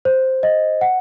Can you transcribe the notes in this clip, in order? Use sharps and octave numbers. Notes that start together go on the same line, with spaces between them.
C5
D#5
F#5